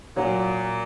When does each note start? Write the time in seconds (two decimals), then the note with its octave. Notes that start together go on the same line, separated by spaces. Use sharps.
0.16 A#2 F#3